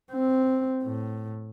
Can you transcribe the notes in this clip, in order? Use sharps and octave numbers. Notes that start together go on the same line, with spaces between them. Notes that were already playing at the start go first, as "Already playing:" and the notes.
C4
A2